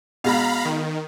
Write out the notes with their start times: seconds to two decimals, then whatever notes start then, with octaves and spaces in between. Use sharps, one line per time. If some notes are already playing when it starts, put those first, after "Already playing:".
0.24 B2 G#3 F5 A#5 B5
0.65 D#3